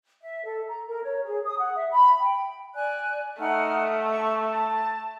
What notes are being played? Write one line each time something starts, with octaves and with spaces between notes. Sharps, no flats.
E5
A4
A#5
A#4
C#5
G#4
D#6
F#5
E5
B5
G5
D5 G#5 F#6
A3 D#4 F#5 F6
C#6
A5